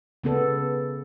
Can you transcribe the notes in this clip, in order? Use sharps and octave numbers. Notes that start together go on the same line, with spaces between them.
C#3 B3 A4